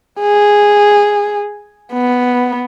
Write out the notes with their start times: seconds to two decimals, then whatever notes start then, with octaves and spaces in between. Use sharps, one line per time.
0.20 G#4
1.92 B3